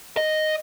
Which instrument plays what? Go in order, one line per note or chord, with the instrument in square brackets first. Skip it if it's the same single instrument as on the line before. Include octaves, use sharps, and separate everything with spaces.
[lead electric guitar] D#5